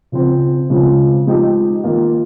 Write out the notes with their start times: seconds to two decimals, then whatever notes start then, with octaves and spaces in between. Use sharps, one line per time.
0.12 C#3 F3 C4
0.70 C#3 F3 G#3 C4
1.26 F3 G#3 D#4 G4
1.84 D#3 A#3 F4